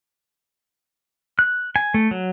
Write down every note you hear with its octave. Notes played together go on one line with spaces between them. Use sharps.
F#6
G#5
A3
F#3